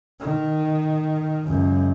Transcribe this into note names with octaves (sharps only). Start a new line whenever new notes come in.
D#3
C#2 F#2